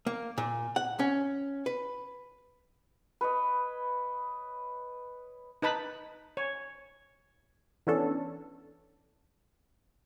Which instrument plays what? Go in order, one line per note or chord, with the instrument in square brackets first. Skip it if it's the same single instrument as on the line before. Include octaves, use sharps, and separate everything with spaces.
[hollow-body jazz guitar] A#3
A#2
F#5
C#4
B4
[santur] B4 C#5 D#5
[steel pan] D#4 B4 A5 B5
C#5
[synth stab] E3 B3 C#4 D4 A4